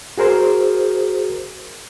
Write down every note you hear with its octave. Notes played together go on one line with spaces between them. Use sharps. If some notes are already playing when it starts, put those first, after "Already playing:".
F#4 G#4 A#4 C5